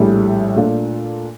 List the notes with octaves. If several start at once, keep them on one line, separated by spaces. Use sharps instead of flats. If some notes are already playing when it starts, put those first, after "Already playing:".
Already playing: A#1 A2 G3
A#2 A3 D4 F4